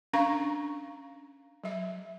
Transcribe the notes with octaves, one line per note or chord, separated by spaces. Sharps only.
C#4 D4 F5 A#5 C#6
F#3 E5